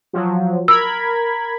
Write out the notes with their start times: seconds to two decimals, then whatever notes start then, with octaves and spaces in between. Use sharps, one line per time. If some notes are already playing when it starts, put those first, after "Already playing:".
0.13 F3 F#3
0.68 A#4 B5 E6 G#6